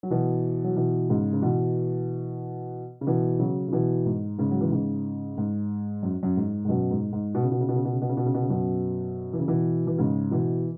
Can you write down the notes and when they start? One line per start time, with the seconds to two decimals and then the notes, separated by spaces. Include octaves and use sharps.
0.03 F#3
0.11 B2 E3
0.64 F#3
0.76 B2 E3
1.09 G#2 C#3
1.33 C#3
1.42 B2 E3
3.01 C#3
3.07 B2 E3
3.39 C#3 F#3
3.68 C#3
3.72 B2 E3
4.05 G#2
4.38 G#2 C#3
4.51 F#3
4.61 E3
4.72 G#2 C#3
5.38 G#2
6.03 F#2
6.23 F#2
6.37 G#2
6.65 G#2
6.69 F#2 B2
6.91 G#2
7.13 G#2
7.35 B2
7.43 C#3
7.52 B2
7.60 C#3
7.68 B2
7.76 C#3
7.85 B2
7.93 C#3
8.02 B2
8.09 C#3
8.17 B2
8.26 C#3
8.34 B2
8.42 C#3
8.50 F#2 B2
9.33 E3
9.39 C#3
9.47 B2 E3
9.87 E3
9.98 G#2 C#3
10.31 B2 E3